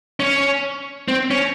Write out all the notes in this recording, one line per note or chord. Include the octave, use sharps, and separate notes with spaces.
C#4
C4
C#4